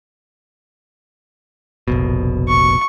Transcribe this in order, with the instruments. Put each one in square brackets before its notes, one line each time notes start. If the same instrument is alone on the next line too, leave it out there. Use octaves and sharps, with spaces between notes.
[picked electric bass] F1 A#1 B2
[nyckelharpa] C#6